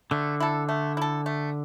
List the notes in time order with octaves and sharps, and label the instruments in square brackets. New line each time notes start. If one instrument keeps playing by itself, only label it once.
[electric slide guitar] D3 [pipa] A3
[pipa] E4 A4
A3
E4 A4
A3